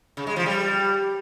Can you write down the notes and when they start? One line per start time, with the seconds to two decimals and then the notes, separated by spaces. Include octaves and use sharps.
0.17 C#3
0.27 G#3
0.36 F3
0.46 G3